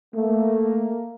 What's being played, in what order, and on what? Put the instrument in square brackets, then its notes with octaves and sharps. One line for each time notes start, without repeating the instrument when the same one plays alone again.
[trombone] A3 [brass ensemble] A#3